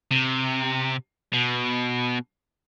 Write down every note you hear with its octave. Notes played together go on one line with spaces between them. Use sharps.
C3
B2